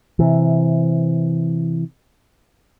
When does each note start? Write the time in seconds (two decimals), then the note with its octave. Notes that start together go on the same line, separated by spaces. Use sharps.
0.19 C3 E3